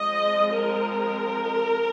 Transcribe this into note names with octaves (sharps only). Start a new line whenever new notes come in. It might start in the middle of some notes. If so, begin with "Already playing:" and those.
Already playing: F3 G#3 C4 D#5
A#4